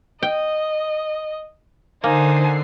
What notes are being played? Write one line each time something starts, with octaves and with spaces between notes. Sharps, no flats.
D#5 G5
D3 A#3 D#4 C5 G#5 C7